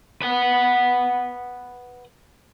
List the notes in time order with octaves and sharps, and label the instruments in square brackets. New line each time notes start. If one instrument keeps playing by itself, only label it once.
[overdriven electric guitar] B4 F#5